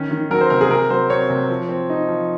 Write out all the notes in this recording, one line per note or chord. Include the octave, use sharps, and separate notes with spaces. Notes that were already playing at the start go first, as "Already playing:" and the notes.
Already playing: D#3 C#4
D#3
F#3 A#4
C5
C3 A#4
G#4
C3 A#4
F#3 C5
C4 C#5
C3
F3
C4
D#4
F3